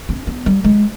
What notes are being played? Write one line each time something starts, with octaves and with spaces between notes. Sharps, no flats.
C4
B3
G3
G#3